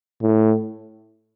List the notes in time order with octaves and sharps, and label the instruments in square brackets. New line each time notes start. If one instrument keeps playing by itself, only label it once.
[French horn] A2